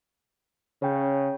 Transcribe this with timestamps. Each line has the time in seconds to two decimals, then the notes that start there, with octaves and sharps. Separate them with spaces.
0.82 C#3 C#5 G5